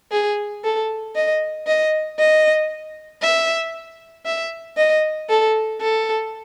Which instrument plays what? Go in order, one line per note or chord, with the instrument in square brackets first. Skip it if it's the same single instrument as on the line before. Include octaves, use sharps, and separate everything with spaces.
[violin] G#4
A4
D#5
D#5
D#5
E5
E5
D#5
A4
A4